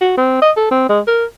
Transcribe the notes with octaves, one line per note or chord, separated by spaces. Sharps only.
F#4
C4
D#5
A4
C4
G#3
A#4